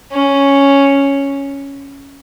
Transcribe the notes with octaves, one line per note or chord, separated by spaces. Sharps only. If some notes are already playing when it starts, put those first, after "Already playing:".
C#4